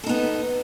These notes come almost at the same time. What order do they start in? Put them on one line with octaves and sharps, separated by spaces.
A4 D#4 B3